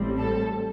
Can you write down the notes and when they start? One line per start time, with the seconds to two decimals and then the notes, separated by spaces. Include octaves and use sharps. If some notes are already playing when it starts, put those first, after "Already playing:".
Already playing: A1 A2 G3 C4
0.18 A4